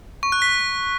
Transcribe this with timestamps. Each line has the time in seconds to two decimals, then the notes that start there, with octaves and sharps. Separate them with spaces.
0.23 C#6
0.32 F#6
0.42 B6